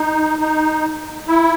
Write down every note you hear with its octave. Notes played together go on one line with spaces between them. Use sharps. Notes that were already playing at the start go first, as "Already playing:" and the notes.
Already playing: D#4
D#4
E4